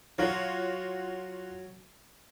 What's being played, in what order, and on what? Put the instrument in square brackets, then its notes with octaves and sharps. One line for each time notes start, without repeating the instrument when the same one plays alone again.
[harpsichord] F#3 [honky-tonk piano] F4 F#4 C#5